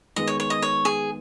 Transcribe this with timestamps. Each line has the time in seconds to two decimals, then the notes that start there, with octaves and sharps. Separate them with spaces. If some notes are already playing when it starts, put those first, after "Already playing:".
0.16 D#3 G#3 B3 D#5
0.27 C#5
0.40 C#5
0.50 D#5
0.62 C#5
0.85 G#4